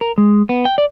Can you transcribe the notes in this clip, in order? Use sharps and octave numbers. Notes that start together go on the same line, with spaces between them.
A#4
G#3
B3
G5
D5